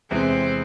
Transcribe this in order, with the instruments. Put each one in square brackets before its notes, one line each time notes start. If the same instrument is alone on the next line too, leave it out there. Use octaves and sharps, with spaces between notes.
[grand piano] E2 C3 E3 G#3 [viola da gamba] C4